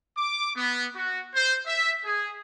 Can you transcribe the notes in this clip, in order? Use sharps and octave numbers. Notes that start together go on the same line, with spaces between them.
D6
B3
F#4
C5
E5
G#4